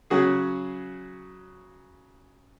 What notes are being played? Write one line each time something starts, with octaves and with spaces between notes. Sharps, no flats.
C#3 F#3 F#4 G#4